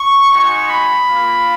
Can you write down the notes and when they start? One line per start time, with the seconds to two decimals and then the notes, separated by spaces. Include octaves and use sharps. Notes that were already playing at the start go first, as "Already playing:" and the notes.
Already playing: C#6
0.31 G#3 D#4 F#4 C#6
0.68 B5
1.06 A#3 F4